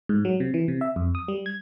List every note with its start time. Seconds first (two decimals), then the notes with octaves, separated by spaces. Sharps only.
0.09 G#2
0.25 F#3
0.40 C3
0.54 E3
0.68 C3
0.81 E5
0.96 F2
1.15 D#6
1.28 G3
1.46 G#6